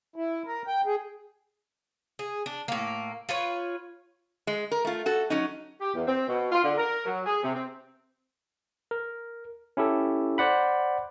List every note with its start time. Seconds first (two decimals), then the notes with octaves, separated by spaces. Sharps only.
0.16 E4
0.46 A#4
0.67 G5
0.86 G#4
2.19 G#4
2.46 D4
2.68 A2 A#3
3.29 F4 B4 C#5
4.47 G#3
4.71 A#4
4.85 A3 F4
5.06 F#4 A4
5.30 F#3 C#4 D#4
5.81 G4
5.94 E2
6.07 C4
6.28 B2
6.52 F4
6.64 D3
6.78 A#4
7.06 F#3
7.26 G#4
7.43 C3
7.55 C4
8.91 A#4
9.77 C#4 E4 G4 A4
10.38 C5 D5 F#5 B5